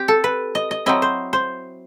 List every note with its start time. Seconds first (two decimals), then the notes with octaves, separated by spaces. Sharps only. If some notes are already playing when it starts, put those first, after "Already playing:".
Already playing: C4 G4
0.08 A4
0.24 B4
0.55 D#5
0.71 D#5
0.86 F#3 C4 E4 D#5
1.02 C5
1.33 C5